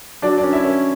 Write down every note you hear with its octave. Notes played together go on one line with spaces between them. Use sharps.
F#3 D4 D5
D4 D5
C#4
E4 E5
C#4